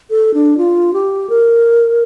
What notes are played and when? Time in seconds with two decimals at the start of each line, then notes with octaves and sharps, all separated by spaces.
0.10 A4
0.34 D4
0.58 F4
0.94 G4
1.30 A#4